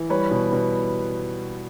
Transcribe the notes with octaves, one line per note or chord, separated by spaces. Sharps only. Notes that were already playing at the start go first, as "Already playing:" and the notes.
Already playing: E3
G3 B4 C#5
B2
B2